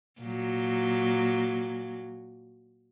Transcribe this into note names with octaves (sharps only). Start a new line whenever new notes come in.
A#2 F#3